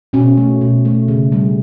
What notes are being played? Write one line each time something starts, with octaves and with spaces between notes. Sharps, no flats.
B2 C#4
A3
B2
A3
C#3
G3